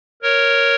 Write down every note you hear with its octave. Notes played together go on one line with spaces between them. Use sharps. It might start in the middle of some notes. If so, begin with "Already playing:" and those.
A#4 C#5